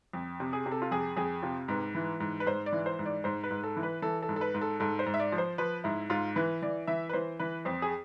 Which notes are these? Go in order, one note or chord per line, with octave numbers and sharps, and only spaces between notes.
F2
C3
G#4
C3
A4
F4
F2 G#4
F2 G#4
C3 F4
G#2 B4
E3
G#2
B4
G#2 C5
D5
E3
C5
G#2
D5
G#2 C5
B4
G#2
A4
E3
B4
E3 A4
A4
G#2
A4
B4
G#2
A4
G#2 A4
C5
G#2
E5
D5
F3
C5
F3 B4
G#2 E4
G#2 F4
E3 B4
E3 D5
E3 E5
B4
E3 C5
E3 B4
F2 C5
G#4